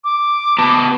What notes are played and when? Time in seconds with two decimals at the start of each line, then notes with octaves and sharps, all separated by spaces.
0.04 D6
0.59 B3 A5